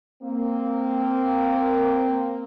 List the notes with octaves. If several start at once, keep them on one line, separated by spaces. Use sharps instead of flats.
A#3 C4